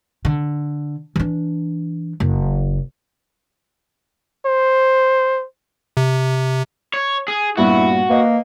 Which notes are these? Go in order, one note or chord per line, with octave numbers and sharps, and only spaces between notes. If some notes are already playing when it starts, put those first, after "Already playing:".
D3
E3 D4
F#1
C5
C3
C#5
G#4
G2 A#2 B3 E4 F#4
A#3 B4 D#5